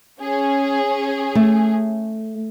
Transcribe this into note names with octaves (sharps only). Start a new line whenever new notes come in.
C#4 G#4
A3